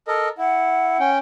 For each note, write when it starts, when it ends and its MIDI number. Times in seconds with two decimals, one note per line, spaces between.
0.08 0.28 69
0.08 0.28 70
0.08 0.28 75
0.38 0.97 64
0.38 1.10 78
1.00 1.18 61
1.00 1.18 79